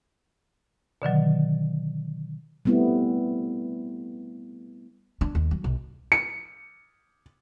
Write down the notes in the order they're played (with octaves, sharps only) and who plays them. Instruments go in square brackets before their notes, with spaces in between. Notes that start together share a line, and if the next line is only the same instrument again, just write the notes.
[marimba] B2 D3 D#3 F#3
[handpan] G3 A3 B3 C4 E4
[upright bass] D4
D#2
F#3
B1
[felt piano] C#7